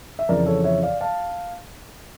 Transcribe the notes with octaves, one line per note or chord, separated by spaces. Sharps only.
E5
F2 C#3 E3 A#4 D5
A4 C#5
C#5 E5
D5 F5
F5 A5